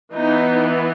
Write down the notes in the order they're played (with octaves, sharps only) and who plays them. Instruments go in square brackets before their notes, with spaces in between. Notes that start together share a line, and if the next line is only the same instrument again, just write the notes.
[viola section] E3 B3 D#4